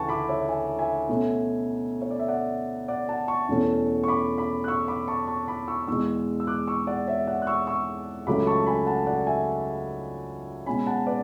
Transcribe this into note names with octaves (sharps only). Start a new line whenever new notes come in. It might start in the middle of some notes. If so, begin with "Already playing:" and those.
Already playing: D2 C#3 E3 B4 F#5 G#5 A5 C#6
B5 D6
C#5 E5
E5 G#5
E5 G#5
B2 A3 C#4
C#5
D5
E5
D5 F#5
D5 F#5
F#5 A5
A5 C#6
E2 B2 A3 C#4
C#6
B5 D6
B5 D6
F#6
C#6 E6
B5 D6
A5 C#6
A5 C#6
B5 D6
C#6 E6
E2 B2 G#3 C#6 E6
E6
D6 F#6
C#6 E6
D5 F#5
C#5 E5
D5 F#5
F#6
C#6 E6
C#6 E6
C#2 C#3 F#3 A3 C#4 B5 D6
A5 C#6
G#5 B5
F#5 A5
D5 F#5
E5 G#5
B2 G#3 C#4 G#5 B5
F#5 A5
B4 D5